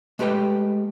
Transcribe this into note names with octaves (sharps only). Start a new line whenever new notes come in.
G#3 A3 G4 B4 G5